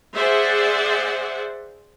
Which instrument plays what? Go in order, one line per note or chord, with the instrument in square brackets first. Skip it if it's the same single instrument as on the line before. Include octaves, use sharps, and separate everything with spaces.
[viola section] G#4 C5 D5 E5 F#5